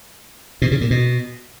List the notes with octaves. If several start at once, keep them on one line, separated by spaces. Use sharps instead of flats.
B2
C#3
A#2
B2